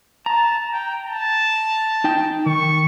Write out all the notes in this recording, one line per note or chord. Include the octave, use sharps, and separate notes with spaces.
A5 A#5
G5
A5
D#4 G5
D#3 C#6